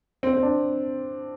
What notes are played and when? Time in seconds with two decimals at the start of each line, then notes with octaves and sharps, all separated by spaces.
0.23 C4
0.33 C4
0.43 D4